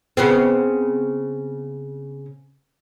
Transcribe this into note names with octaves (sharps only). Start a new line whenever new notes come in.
C#3 B3 C4